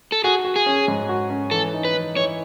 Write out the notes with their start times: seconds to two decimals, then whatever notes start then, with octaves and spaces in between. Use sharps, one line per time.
0.12 A4
0.24 F#4 G#4
0.45 F#4
0.56 G#4
0.66 C#4
0.88 G#2
1.09 F#4
1.30 C#4
1.51 E3 A4
1.73 D#4
1.85 B4
1.95 E3
2.16 E3 C#5